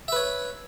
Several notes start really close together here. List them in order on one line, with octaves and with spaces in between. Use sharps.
E5 B4 C#5